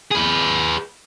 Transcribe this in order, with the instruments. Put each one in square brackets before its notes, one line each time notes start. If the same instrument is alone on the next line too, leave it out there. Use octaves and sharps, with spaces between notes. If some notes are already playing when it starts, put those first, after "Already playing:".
[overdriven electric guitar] G#4 B4